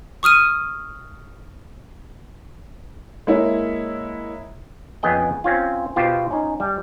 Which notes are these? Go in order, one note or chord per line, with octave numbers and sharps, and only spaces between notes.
C#6 D#6 F6 D#7
G#3 A#3 E4 C#5
F2 B3 C#4 G#4 D#5 G5
C4 C#4 F4
B2 F4 G4 C5
C#4 D#4
G3